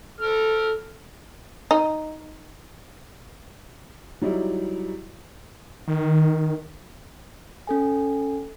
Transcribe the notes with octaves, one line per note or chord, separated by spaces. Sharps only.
A4 F6
D#4
F#3 G3 D#4 E4
D#3
C#4 A4 G#5